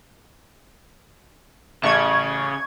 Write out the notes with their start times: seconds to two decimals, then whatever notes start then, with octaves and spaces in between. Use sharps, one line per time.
1.83 A1 C#3 C#6 G#6